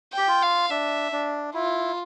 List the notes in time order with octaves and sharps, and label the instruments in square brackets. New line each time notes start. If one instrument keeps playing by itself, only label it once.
[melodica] G4 [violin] G5
[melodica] F4
[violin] F5
[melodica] D4 [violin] E5
[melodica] D4
[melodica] E4 [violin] F4